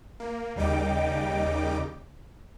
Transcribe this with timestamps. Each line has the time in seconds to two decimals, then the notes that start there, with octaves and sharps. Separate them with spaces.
0.20 A#3
0.56 D#2 C#3 G3 D#4 G5 D6